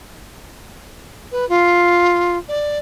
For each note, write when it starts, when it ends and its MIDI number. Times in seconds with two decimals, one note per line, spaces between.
1.31 1.47 71
1.49 2.37 65
2.48 2.78 74